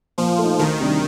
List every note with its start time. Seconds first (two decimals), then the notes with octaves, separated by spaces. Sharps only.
0.18 A#2 F3
0.39 A3 D#4
0.59 D2 D#3
0.80 C3 G3 D4